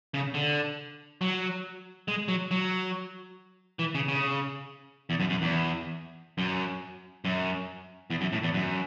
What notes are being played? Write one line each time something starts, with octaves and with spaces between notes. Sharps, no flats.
C#3
D3
F#3
G#3
F#3
F#3
E3
C#3
C#3
E2
F#2
F#2
E2
F#2
F#2
E2
F#2
A2
E2
F#2